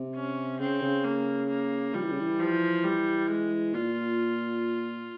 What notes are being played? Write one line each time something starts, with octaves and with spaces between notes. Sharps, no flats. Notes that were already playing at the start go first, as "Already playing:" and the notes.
Already playing: C3
C#4
C#3 C4
C#3
A#3
A#3
F3 G3
E3
C#3
E3
F3
G3
G#3
A#2 F4